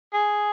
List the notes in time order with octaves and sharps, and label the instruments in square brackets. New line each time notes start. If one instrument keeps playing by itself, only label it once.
[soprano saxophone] G#4